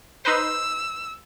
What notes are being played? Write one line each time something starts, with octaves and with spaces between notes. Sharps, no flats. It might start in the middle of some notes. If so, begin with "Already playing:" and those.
D#4 B4 C5 E6